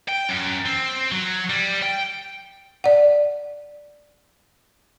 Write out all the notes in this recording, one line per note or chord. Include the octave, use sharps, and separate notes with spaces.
G5
F#2
C4
F#3
G3
G5
D5 F#5